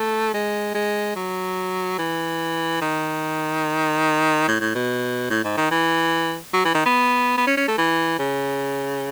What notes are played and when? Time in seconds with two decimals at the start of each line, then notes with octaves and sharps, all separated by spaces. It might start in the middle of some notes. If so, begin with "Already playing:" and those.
Already playing: A3
0.34 G#3
0.74 G#3
1.16 F#3
1.99 E3
2.81 D#3
4.48 A2
4.61 A2
4.75 B2
5.30 A2
5.44 G#2
5.57 D#3
5.71 E3
6.54 F#3
6.65 E3
6.74 D#3
6.86 B3
7.37 B3
7.47 C#4
7.57 C#4
7.68 A3
7.78 E3
8.19 C#3